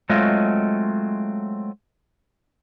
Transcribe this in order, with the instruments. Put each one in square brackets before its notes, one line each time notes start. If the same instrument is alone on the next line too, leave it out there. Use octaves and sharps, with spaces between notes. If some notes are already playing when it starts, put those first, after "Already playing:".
[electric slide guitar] F#3 G#3 A3 C4 F4 D#5